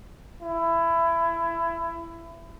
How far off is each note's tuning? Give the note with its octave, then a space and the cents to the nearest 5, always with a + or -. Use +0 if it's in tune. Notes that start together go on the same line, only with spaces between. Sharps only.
E4 +20